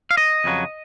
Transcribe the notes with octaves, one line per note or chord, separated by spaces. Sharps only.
F5
D#5
F2 C#3 F#3